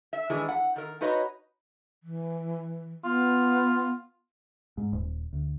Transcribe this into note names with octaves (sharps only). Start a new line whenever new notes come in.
E5
D#3 E3 G#3 D4 G#4
F#5
D#3 A#4
D#4 F#4 B4 C#5 D#5
E3
B3 F4
G#2
D#1
D2